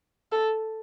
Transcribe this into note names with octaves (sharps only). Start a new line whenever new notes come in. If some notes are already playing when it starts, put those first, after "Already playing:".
A4